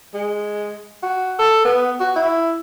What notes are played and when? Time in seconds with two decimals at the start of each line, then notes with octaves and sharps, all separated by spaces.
0.14 G#3
1.03 F#4
1.39 A4
1.65 B3
2.00 F#4
2.16 E4